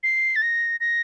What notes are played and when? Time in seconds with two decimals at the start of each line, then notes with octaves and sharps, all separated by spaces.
0.03 C7
0.36 A6
0.42 A#6
0.80 A#6